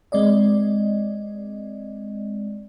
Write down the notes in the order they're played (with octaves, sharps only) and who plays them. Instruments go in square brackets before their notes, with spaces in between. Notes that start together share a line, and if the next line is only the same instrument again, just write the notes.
[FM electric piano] G#3 C4 D5 D#5